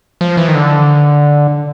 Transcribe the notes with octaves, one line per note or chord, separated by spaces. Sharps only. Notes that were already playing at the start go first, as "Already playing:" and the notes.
F3
E3
D#3
D3